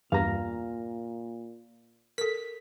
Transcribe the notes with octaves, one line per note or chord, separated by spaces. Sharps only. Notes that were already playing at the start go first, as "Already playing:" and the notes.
E2 G2 A#2 F5 A#5
A4 A#4 B6